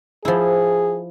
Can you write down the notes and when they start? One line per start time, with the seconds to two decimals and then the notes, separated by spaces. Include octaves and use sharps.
0.25 F3 E4 G#4